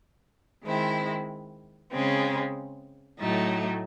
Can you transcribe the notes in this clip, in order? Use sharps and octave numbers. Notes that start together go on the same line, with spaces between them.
D#3 G#3 C4 E4
C#3 G#3 C4
A2 F#3 A3 D#4